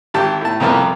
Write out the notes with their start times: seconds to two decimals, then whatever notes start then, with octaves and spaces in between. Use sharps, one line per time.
0.14 G#1 G4 A5
0.41 A2 A5
0.60 C2 F2 F3 A#3 B3